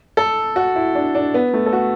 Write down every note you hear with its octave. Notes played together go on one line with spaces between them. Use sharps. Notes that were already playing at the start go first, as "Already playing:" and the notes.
A4
F#4
E4
D4
D4
B3
A3
A4
F#4